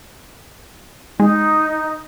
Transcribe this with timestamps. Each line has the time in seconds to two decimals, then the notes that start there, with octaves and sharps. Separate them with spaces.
1.20 G#3 D#4